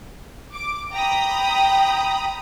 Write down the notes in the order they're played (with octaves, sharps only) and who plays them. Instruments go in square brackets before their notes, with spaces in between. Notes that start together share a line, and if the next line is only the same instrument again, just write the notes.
[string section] D6
[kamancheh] G5 [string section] A#5 B5 D#6